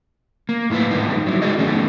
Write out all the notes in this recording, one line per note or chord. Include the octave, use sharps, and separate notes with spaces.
A#3
A2 E4 F4 B4
G#2 D3 D#3 G3 B3 D#4
F#3 D#4 E4
G#3 D#4 F#4 G#4 D5 D#5
D#3 G3 A3 B3 C#4